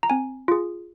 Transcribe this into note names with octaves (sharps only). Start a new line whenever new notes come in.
A#5
C4 G#5
F4 G#4